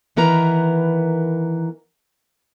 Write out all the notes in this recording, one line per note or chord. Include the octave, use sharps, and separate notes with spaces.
D#3 E3 B3 A#4 A#5